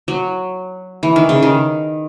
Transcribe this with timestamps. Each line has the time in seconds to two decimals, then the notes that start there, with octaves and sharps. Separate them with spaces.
0.08 F#3
1.03 E3
1.16 D#3
1.29 C#3
1.42 D#3